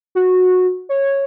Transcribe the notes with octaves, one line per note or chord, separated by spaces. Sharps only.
F#4
C#5